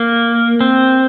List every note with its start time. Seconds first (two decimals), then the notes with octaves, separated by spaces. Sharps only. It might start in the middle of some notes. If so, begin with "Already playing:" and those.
Already playing: A#3
0.61 C4